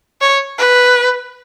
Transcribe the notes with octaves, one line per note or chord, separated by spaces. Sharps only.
C#5
B4